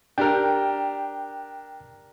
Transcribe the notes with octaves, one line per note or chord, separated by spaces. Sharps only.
D4 G4 A#4 G5